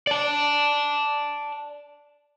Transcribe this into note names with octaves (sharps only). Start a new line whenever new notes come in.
D5 A5